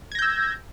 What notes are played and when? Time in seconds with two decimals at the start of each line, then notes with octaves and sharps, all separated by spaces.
0.12 G#6
0.15 A#6
0.19 G6
0.22 E6